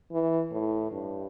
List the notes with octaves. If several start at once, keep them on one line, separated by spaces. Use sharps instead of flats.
E3
A2
G2